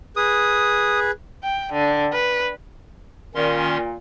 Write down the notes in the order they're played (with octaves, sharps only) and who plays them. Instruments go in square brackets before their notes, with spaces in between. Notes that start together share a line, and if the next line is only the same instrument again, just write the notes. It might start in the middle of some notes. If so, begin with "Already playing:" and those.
[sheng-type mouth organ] G#4 B4 [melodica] D#6
[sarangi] G5
D3
B4
[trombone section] A#2 [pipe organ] D#3 C#4 C6